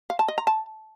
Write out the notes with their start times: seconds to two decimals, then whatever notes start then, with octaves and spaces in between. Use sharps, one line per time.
0.10 F5
0.19 A5
0.28 D#5
0.38 A#5
0.47 A5